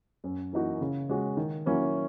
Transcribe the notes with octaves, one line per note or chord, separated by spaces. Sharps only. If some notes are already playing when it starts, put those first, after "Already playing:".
F#2
E3 A#3 D#4 F#4
C#3
G#3 C#4 F#4
D#3
F#3 A#3 C#4 E4